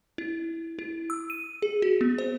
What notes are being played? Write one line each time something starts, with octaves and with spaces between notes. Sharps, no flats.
E4
E4
E6
D#7
G#4
F#4
B3
C5